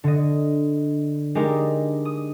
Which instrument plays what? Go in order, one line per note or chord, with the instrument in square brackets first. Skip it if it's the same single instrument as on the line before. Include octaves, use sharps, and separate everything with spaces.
[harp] D3 D#5
G#3 D4 D#4 G4 A#4
D#6